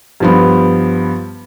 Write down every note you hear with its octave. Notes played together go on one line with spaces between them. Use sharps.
G2 F3 B3